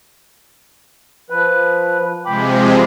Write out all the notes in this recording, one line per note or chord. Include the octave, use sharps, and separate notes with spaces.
F3 B4
C3 F3 G#3 G5 B5 D6